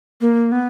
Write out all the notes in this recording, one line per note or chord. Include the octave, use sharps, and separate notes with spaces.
A#3
B3